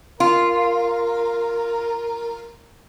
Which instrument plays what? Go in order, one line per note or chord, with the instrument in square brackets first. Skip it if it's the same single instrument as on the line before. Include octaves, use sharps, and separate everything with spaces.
[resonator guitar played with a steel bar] F4 [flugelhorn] A#4